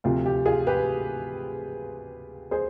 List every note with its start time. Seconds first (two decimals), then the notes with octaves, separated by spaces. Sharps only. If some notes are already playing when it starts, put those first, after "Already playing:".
0.04 D2 C3 F3 F4
0.26 G4
0.46 F4 G#4
0.67 G4 B4
2.51 G#4 C5